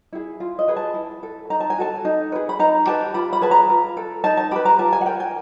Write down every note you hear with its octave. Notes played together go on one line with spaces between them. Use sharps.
E4 G#4
F4
D#5
G#4 B4
A5
E4
A4
D#4 A#5
A5
G#5
F#4 A4 A5
D#4
G#4 B4
B5
D#4 A#5
G4 B4 A5
F4 B5
B5
G#4 B4 A5
A#5
F4
A4
D#4 A5
A5
G4 B4 B5
A#5
F4 A5
G#5
F#5
A#4 G5
G#5